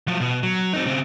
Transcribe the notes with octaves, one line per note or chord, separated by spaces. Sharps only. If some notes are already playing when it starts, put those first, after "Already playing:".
F3 F#3
B2
F#3
C4 D#4
C#3 C4